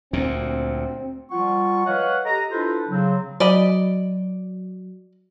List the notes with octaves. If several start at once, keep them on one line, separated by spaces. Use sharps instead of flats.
D2 A#2 C4
F3 G3 F4 F#5 C#6
B4 C#5 D#5 F5 F#5
G4 A4 D#5 A#5
D4 E4 F4 A4 B4 C5
C#3 F#3 C4
F#3 D5 D#5 B5